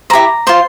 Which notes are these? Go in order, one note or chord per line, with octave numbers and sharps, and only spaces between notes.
E4 G4 C5 A#5
F4 C5 C6